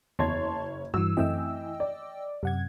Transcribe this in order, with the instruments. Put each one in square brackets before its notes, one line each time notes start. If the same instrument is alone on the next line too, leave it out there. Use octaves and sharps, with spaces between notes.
[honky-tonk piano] F#1 C#5 G#6 [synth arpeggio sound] E2 [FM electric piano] A5 C6
[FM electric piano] G2 E3 [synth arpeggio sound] F#4 [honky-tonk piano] E6
[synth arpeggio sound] F#2 A3 C4 [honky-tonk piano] E3 [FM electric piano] D#5 G5 E6
[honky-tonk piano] D5
[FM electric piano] F#2 F#5 G#6 [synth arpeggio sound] C3